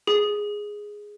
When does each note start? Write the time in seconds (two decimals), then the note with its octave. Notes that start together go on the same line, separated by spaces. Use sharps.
0.07 G#4